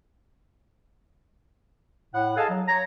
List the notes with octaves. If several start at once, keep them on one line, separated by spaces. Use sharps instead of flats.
A2 F#5
G#4 A4 D#5 F5 G#5 A5
F#3
C#5 A#5